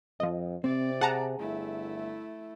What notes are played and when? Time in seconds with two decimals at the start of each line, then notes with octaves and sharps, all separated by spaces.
0.20 F2 F3 D#5
0.64 C3 C4 D5
1.01 G#4 F#5 A5 A#5
1.39 G1 A3 E4